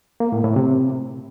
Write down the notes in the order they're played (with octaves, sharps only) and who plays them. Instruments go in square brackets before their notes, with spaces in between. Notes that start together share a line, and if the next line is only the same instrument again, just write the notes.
[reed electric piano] A#3
A2
A2
C3